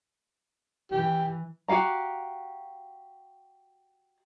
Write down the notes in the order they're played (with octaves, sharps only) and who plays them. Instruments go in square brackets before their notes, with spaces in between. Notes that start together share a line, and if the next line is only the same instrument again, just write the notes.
[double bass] E3 [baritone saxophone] G4
[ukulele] F#4 G4 F5 A#5